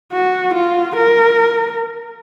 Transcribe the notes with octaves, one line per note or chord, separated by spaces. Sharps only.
F#4
F4
A#4